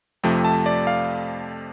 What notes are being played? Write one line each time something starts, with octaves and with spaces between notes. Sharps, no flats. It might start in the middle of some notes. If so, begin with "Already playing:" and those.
F2 C3 F3 A3 G5
A5
D5
F5